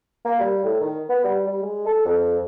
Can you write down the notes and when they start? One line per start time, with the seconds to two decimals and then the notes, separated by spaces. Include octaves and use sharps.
0.25 A#3
0.40 G3
0.64 A2
0.80 D#3
1.09 B3
1.24 G3
1.47 G3
1.62 G#3
1.86 A4
2.05 F2